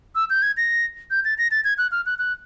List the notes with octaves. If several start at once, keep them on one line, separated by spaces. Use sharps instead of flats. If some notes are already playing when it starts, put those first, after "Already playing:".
E6
G6
G#6
A#6
G6
A6
A#6
A6
G#6
F#6
F6
F#6
F#6